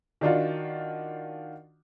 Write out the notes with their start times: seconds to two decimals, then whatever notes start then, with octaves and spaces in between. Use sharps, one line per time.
0.21 D#3 D4 F4 F#4